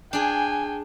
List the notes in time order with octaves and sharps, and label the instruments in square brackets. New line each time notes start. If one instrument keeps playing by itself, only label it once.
[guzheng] D4 G#4 [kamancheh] G5 G#5